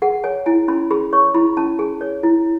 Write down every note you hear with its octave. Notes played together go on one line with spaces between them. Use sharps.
G#4 F#5
C#5 G#5
E4 G#5
C#4 B5
G#4 B5
C#5 C#6
E4 B5
C#4 A5
G#4 G#5
C#5
E4